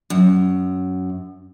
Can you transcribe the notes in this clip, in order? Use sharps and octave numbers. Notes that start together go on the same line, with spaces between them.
F#2